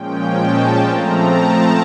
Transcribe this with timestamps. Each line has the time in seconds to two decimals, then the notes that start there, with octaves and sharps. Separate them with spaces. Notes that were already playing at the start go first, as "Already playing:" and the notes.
Already playing: A#2 F3 G#3 C#4 G5
0.37 A5
0.82 F3 A3 C4 A#5
1.28 A5